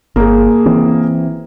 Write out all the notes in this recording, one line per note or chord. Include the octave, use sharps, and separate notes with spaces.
G1 A#3 G#4
E3 C4